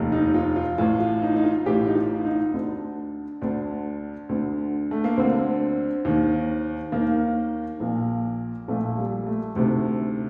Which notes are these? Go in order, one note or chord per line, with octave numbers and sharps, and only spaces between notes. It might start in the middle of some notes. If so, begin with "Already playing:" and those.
Already playing: F1 D#2 D#3
D#4
F4
F4
A1 A2 F4
F4
D#4
D#4
F4
A1 A2 G4
D#4
F4
D#4
D2 D3 D4
D2 D3 D4
D2 D3
A3
A#3
D2 D3 C4
D#2 D#3
D#2 D#3 A#3
A#1 A#2
A#1 A#2 A3
G3
A3
D2 C3 D#3 A3